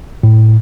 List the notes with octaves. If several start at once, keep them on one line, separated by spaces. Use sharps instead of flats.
A2